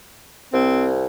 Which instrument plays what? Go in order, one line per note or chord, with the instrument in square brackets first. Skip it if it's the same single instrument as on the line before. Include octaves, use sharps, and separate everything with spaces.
[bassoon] C2 [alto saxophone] C4